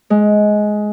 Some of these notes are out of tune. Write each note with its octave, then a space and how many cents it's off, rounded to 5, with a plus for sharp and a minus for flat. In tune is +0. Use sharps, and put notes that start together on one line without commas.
G#3 +15